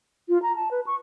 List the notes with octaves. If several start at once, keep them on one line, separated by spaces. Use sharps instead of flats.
F4
A#5
A5
B4
C#6